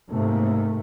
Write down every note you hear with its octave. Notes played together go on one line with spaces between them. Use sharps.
G#2 C3 A3 A#3